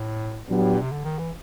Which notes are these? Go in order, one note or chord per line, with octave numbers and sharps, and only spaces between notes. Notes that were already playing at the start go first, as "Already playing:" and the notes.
Already playing: A2
A#2 F#3 B3 D4 G4
A2
A#2
C3
D3
D#3
E3